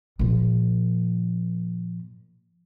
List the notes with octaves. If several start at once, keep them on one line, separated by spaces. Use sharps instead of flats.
A#2 F3